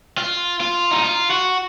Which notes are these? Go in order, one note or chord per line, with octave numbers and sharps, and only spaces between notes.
F4
F4
D#4
F4
F#4